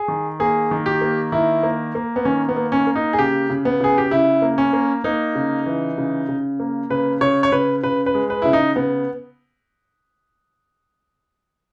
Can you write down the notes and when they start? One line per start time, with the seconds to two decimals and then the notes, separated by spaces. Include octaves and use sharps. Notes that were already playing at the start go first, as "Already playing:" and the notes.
Already playing: G#4
0.08 D#3
0.40 A#3 G#4
0.71 D#3
0.86 G4
1.01 A#3
1.32 D#3 E4
1.63 A#3
1.95 A#3
2.16 B3
2.25 D#3 C#4
2.49 B3
2.56 A#3
2.72 C#4
2.87 A#3
2.95 D#4
3.13 G#4
3.18 C#3 G4
3.50 C#3
3.65 B3
3.80 C#3 G#4
3.98 G4
4.11 C#3 E4
4.42 A#3
4.58 C#4
4.73 A#3
5.04 A#3 D#4
5.35 C#3
5.66 E3
5.98 C#3
6.28 C#3
6.60 A#3
6.90 C#3 B4
7.21 C#3 C#5
7.43 C#5
7.52 C#3 B4
7.83 C#3 B4
8.06 B4
8.14 G#3
8.30 B4
8.42 C#3 E4
8.53 D#4
8.76 C#3 B3